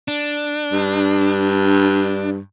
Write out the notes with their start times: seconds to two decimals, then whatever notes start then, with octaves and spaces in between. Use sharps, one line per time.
0.08 D4
0.73 G2